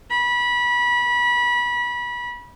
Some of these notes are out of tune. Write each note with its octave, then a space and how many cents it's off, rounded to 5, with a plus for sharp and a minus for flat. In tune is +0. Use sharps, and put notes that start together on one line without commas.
B5 -25